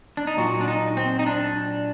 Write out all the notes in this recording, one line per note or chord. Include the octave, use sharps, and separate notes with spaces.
D4
D#4
A#2 F#3 F#4
D4
D#4
C4
D#4
D4